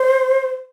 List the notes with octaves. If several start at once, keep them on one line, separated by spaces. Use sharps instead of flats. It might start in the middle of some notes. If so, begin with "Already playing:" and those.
Already playing: C5